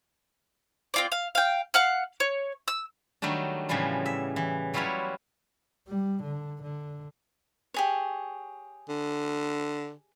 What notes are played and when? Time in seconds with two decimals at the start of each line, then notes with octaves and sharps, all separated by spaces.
0.94 C4 F4 D5
1.12 F5
1.35 F5 G5
1.74 F5 F#5 F6
2.20 C#5
2.68 E6
3.22 D#3 F#3 G3 A3 D4
3.69 A2 C#3 E3 F3 G3 B3
4.06 E5
4.36 E3
4.74 F#3 G3 E4 F4 B4 C#5
5.88 G3
6.23 D3
6.63 D3
7.74 G4 G#4 C#5
8.89 D3